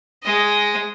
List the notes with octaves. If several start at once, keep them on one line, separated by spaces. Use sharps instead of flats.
G#3 D#5